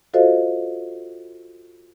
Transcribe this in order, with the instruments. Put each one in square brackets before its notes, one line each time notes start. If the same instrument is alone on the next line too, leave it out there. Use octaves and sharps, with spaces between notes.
[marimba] F4 F#4 A4 C5 D#5 F5